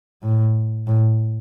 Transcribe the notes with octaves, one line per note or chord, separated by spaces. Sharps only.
A2
A2